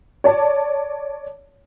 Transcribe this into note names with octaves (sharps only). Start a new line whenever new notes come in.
C#5 D5 A5